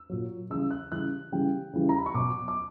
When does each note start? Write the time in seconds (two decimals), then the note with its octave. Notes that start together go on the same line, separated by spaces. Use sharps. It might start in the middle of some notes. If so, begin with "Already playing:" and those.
Already playing: E6
0.10 A#2 F#3
0.50 C#3 E3 G3 E6
0.71 F#6
0.92 C#3 E3 G3 F#6
1.32 C#3 E3 G3 G5
1.73 C#3 E3 G3
1.89 A#5
1.98 B5
2.06 C#6
2.14 B2 F#3 D6
2.48 D6